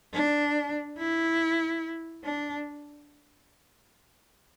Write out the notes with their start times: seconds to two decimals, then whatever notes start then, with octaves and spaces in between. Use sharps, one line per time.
0.14 D4
0.98 E4
2.24 D4